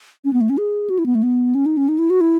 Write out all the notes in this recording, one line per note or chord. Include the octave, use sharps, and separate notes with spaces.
C#4
B3
A3
C#4
G#4
F#4
E4
B3
A3
B3
C#4
D#4
C#4
D#4
E4
F#4
E4